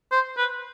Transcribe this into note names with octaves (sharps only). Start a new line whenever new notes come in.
C5
B4